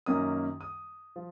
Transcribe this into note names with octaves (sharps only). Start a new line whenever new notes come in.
F#2 D#3 A#3 C#4 D#6
D#6
F3